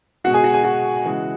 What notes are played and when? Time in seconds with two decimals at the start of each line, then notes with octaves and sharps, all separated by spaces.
0.24 B2 G#3 F#4 F#5
0.34 G#4 G#5
0.44 F#4 F#5
0.54 G#4 G#5
0.64 F#4 F#5
1.04 C#3 E3 G#3